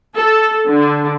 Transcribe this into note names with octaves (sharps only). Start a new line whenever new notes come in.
A4
D3